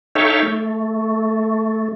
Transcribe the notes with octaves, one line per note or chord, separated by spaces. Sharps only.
D#4 A4 C#5 E5 F5 G5
A3